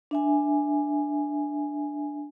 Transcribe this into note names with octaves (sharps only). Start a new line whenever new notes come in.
D4 E5 G#5